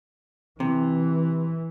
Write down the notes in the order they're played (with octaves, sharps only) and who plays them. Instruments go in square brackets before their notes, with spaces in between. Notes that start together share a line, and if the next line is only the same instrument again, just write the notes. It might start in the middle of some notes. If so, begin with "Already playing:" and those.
[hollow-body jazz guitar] C3 [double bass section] E3